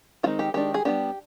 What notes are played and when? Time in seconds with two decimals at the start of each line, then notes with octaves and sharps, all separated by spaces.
0.23 D#3 G#3 C4 D#4 F4
0.39 G4
0.54 D#3 G#3 D4 G4
0.74 G#4
0.85 G3 B3 D4 G4